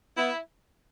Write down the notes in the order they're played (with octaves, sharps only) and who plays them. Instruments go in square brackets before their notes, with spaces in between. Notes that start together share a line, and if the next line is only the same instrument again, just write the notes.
[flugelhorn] B3 [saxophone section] E4